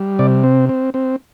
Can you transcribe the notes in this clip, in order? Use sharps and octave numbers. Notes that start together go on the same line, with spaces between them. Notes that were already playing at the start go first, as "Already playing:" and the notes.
Already playing: G3
C3 D5
C4
C4
C4